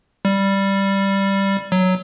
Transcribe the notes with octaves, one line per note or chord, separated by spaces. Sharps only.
G3
F#3